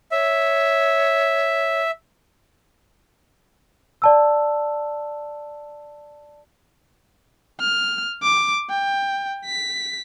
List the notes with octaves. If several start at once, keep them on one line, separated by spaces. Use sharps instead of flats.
C#5 E5
D5 A5 E6
F6
D6
G5
B6